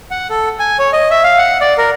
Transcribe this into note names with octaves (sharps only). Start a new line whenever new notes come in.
F#5
A4
G#5
C#5
D#5
E5
F5
F#5
D5
A#4